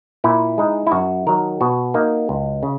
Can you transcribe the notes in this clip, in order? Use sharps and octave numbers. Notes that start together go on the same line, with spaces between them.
A#2 E4
G#3 D#4
E4
F#2 F#4
D#3 F#3 A#4
B2 F#4
A#3 D#4
C#2
C#3